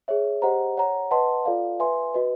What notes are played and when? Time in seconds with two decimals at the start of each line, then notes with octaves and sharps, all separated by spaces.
0.08 G#4 C#5 E5
0.42 G4 C5 D#5 F#5 A#5
0.77 C#5 F#5 A#5
1.11 B4 D#5 F#5 A5 C6
1.45 F4 A4 D5 F5
1.80 B4 E5 G#5 C6
2.14 F#4 B4 D#5